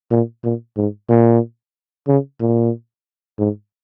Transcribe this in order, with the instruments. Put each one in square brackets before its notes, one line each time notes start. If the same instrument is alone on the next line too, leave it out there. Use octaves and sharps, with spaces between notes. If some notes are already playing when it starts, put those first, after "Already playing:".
[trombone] A#2
A#2
G#2
A#2
C#3
A#2
G#2